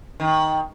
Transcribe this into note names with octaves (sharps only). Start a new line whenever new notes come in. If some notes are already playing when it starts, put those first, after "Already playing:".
D#3